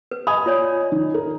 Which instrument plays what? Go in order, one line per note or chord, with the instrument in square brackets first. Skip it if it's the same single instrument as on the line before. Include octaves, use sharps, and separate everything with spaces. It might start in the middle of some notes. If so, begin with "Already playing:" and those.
[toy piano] B4
[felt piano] D#5 G#5 D#6 [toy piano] B5
[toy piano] F4 C#5 D5
[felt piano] D#3
A#4